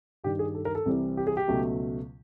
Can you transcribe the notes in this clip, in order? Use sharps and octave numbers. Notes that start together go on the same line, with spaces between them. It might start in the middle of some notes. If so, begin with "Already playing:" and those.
G2 D#3 G3 G4
G#4
A4
A#4
A4
C2 C3 E3 G3 C4
G4
G#4
G4
C#2 B2 F#3 A3